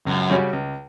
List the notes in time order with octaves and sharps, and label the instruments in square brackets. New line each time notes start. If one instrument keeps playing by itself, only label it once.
[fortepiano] C#2 [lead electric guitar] F#2
[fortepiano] C#3 G3 C#4 F#4
C#2